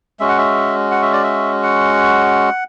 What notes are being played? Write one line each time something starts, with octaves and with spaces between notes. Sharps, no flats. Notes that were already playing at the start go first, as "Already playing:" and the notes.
G#3 C#4 F#4 E5
F#5
E5
F#5
E5
D5
E5
F#5